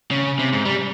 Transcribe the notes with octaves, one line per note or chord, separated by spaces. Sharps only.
C#3
C3
G#2
G3